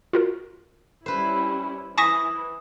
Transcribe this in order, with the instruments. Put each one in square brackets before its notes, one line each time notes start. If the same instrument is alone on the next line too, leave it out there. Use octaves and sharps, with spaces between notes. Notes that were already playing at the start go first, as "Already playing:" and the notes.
[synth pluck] F4 F#4 A#4
[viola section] G3 C#4 E4 [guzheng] B4 C5
[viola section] E3 [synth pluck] G#5 C#6 B6 [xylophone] D#6 A#6 E7